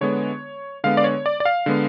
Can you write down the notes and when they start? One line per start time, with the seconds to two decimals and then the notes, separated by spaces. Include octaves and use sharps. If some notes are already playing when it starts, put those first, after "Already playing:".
0.01 D3 G#3 B3 C#5
0.84 D3 G#3 B3 F5
0.97 D5
1.04 C#5
1.26 D5
1.40 D5
1.45 F5
1.66 D3 G#3 B3